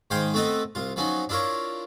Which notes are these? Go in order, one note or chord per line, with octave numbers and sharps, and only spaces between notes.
G#2 D#3 C5 F5 G5 G#5
A3 B3 C4 A4 B4 D#5
C2 F4
F3 F#3 B3 C#4 D#4
D4 E4 F4 A#4 C#5